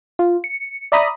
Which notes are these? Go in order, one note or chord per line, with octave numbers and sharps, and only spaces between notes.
F4
C#7
D5 E5 A#5 B5 D#6